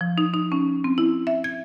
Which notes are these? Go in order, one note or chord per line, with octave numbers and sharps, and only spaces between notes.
F3
D#4
D#4
C#4
C4
E4
E5
G#6